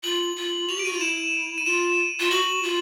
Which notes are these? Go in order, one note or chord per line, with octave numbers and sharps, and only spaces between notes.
F4 F#7
F4
F#4 F7
G4 D7
F#4 D#7
F4
E4 E7
D#7
F4 E7
F4
F#4 F#7
F4